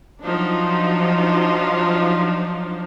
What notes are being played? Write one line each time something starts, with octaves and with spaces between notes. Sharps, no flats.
F3 F#3 D4 D#4